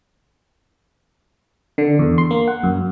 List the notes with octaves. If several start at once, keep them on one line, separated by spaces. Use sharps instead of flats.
D3
E2
C6
A#3
F#5
F#2